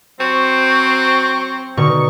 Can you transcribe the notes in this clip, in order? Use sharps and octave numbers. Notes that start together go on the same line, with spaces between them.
F#3 C4 C#6
B2 D3 D#4 C#6